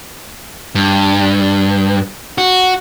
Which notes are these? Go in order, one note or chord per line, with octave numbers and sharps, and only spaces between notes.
G2
F#4